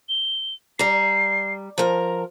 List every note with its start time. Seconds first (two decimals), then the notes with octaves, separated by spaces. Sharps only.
0.09 G7
0.79 G3 A#5 C7
1.78 F3 A#4 A#5